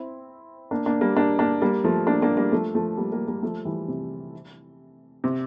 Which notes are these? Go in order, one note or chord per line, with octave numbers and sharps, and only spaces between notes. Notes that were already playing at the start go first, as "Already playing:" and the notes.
Already playing: C4 E4
A#3 D4
A#3 D4
G3 A#3
A#3 D4
A#3 D4
G3 A#3
F3 A3
A#3 D4
A#3 D4
G3 A#3
F3 A3
F3 A3
G3 A#3
G3 A#3
G3 A#3
F3 A3
E3 G3
C3
C3